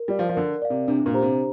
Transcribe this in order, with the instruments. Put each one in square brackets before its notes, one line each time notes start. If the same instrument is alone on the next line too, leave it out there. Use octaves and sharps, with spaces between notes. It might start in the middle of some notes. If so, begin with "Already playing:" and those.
Already playing: [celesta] A#4
[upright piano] G3 [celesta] D5 F5
[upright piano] F3
F3
[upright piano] D3 [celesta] A#4
[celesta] D5 F5
[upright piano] C3
[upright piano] C3 [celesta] D4
[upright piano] C3
A#2
[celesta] G4 C5 A#5
[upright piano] C3